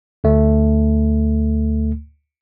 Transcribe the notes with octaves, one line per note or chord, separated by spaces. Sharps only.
D2 A3